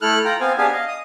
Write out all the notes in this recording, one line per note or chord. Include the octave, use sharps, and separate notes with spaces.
A3 E4 A4 F6 F#6
F4 G5 A#5
B3 C4 C5 F5 G#5
B3 D4 G4 G#4 F5 G#5
D#5 F5
D#6